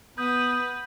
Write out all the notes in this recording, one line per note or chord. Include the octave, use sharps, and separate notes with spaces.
B3 B4 D#6 G6